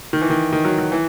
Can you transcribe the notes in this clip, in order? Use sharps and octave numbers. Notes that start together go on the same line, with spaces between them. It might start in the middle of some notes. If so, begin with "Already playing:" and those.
D#3
E3
D#3
D#3
F#3
F#3
E3